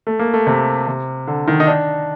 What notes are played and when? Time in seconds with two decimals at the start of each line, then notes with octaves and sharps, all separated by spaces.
0.07 A3
0.19 A#3
0.34 A3
0.47 C3
0.87 C3
1.27 D3
1.48 D#3
1.60 D#4
1.67 D4